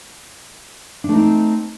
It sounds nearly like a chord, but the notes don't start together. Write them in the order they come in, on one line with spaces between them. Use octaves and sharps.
D4 A3 D#4 C4